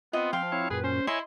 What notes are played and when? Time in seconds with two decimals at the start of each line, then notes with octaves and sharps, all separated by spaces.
0.13 B3 C4 F4 D#5
0.33 F3 F5 G5 C6
0.52 C4 E4 C#5
0.70 F#2 A#2 G#4 B4
0.84 C#4 C5
1.07 E4 C#5 D#5 E5 G#5 C6